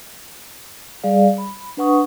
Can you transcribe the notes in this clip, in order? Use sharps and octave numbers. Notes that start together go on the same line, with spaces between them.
G3 G#4 D5 F5
B5
D4 B4 F#5 C#6 D#6